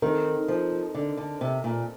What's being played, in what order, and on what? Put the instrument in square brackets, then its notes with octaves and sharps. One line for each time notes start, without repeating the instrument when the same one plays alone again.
[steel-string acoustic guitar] D#3 [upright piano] A3 C4 D#4 A#4
[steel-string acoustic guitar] F3
D3
D3
C3
A#2